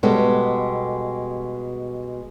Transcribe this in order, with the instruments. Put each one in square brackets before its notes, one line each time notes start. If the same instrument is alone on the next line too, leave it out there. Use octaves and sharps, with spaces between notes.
[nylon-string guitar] B2 G3 G#3 A4